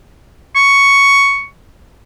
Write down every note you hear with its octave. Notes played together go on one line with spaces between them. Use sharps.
C#6